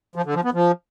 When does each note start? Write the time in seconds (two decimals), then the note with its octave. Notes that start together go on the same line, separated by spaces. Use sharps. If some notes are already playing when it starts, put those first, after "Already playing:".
0.16 F3
0.25 D3
0.35 F3
0.44 B3
0.54 F3